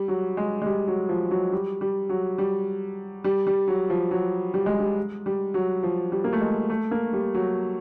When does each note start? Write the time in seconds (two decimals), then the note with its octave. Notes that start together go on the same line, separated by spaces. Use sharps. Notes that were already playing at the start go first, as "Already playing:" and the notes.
Already playing: G3
0.08 F#3
0.37 G#3
0.61 G#3
0.66 G3
0.88 F#3
1.09 F3
1.31 F#3
1.53 G3
1.81 G3
2.09 F#3
2.38 G3
3.24 G3
3.47 G3
3.68 F#3
3.90 F3
4.11 F#3
4.54 G3
4.66 G#3
4.80 G3
5.26 G3
5.54 F#3
5.83 F3
6.12 G3
6.24 A#3
6.33 A3
6.41 G#3
6.70 A3
6.91 A#3
7.13 G3
7.34 F#3